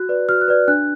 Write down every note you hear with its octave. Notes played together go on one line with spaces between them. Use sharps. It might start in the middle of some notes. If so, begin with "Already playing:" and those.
Already playing: F#4 F#6
B4 D5
F#4 F6
F#6
B4 D5
D4 F#6